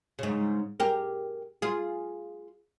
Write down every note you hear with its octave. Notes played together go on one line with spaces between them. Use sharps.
G#2 C#3
G4 G#4 A#4
F4 G#4